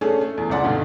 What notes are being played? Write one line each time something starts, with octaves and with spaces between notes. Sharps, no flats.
A3 C#4 D4 G#4 A4
A3
E2
C#2 C#3 D5 F#5 C6
G2 B2 D3 D#4